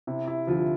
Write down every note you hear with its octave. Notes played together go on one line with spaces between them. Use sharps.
C3 E4
E4
D2 F3 F4